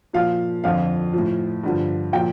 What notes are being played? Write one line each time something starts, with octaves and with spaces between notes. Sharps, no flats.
A#2 F3 F5
F2 D3 F3 F5
A2 F3
G2 D3 F3
A#2 F3 G5